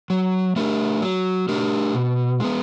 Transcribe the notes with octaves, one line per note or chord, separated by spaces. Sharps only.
F#3
A3 D4 G4 A#4
F#3
A3 D4 G4 A#4
B2
G#3 B3